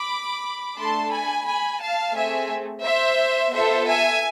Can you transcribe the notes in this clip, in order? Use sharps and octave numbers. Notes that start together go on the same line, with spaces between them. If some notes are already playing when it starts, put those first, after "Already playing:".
Already playing: B5 D6
A3 D4 A4 A5 C6
G#5 B5
G#5 B5
F5 A5
A3 C4 G#4 E5 G#5
C5 E5
B3 F4 A4 C5 E5
E5 G#5